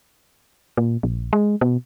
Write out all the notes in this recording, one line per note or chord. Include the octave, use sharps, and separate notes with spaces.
A#2
A#1
G#3
B2